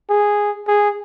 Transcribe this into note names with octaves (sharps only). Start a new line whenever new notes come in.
G#4
G#4